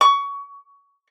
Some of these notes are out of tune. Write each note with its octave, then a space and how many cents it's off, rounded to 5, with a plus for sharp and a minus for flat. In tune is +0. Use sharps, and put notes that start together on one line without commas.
C#6 +20